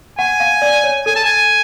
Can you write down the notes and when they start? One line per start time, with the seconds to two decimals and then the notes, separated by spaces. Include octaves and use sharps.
0.18 F#5 G#5
0.40 F5
0.62 D5
0.84 C#5
1.06 A4 G#5
1.16 A5
1.25 G#5